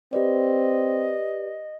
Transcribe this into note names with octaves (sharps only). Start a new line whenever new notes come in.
C4 G4 B4 D5 D#5